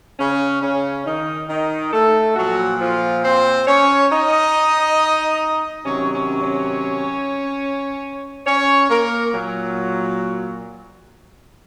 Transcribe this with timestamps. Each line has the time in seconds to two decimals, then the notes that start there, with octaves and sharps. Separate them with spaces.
0.19 C#3 C#4
0.62 C#3 C#4
1.06 D#3 D#4
1.49 D#3 D#4
1.93 A3 A4
2.36 A#2 F3 F#3 F#4
2.80 F3 F4
3.24 C4 C5
3.67 C#4 C#5
4.11 D#4 D#5
5.85 C3 D#3 F#3 C#4 C#5
6.14 C#4 C#5
6.43 C#4 C#5
8.47 C#4 C#5
8.90 A#3 A#4
9.34 A#2 F#3